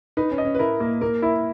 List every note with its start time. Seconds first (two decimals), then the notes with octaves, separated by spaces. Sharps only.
0.17 D#4 B4
0.31 C#4
0.38 D#5
0.45 C#4
0.55 B4
0.59 E4 A#4
0.80 A#3
1.01 A#3 A#4
1.22 E4